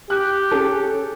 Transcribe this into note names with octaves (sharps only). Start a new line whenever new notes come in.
G4 F#6
C#4 G#4 A4